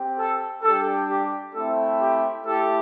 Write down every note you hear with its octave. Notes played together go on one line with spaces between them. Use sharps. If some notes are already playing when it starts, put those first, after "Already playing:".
Already playing: C4 G4
A4
G3 D4 G4 A4
G4
A3 C4 E4 A4
G4
A3 E4 G4 A4